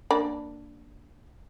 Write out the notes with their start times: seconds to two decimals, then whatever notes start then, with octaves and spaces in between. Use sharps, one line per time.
0.11 A#3 D4 B5